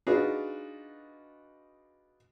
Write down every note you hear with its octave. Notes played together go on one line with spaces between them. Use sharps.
D4 D#4 F4 F#4 G#4 B4